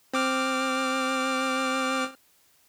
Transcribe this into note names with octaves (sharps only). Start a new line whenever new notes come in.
C4 D6 F6